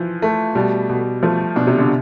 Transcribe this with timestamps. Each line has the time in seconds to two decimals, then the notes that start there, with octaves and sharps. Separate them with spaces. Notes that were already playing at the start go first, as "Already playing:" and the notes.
Already playing: E3 F3
0.22 A3
0.55 B2 G3
0.89 B2
1.23 F3 A3
1.56 B2 D4
1.67 C3
1.78 D3